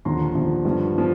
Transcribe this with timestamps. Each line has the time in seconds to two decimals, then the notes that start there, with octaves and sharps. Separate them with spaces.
0.05 D#2 D3 F3 A#5 C6
0.35 D#2 D3 F3
0.65 G2 D3 F3
0.95 D3 F3